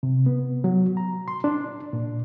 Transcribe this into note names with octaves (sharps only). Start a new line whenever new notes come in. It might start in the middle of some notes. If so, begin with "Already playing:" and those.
C3
B3
F#3
A#5
C6
D4
A#2